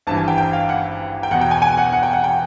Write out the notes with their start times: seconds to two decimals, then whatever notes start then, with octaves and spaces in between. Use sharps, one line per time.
0.07 G#1 G2 E3 A5
0.17 G#5
0.28 G5
0.38 G5
0.53 F5
0.69 F#5
1.23 G5
1.31 E2 F#5
1.34 B2
1.41 G5
1.51 G#5
1.62 G#5
1.77 F#5
1.92 F#5
2.03 G5
2.13 F#5
2.24 G5